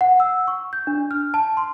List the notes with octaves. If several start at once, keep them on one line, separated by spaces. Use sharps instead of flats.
F#5
E6
C#6
G6
D4
F6
A5
C6